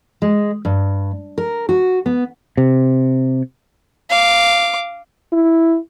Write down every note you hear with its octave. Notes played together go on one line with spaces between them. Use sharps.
G#3
G2
A#4
F#4
B3
C3
F5 D6
E4